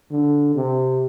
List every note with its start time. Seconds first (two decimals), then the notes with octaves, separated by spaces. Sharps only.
0.11 D3
0.56 C3